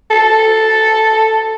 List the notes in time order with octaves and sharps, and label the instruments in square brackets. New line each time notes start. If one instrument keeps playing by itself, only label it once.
[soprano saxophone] A4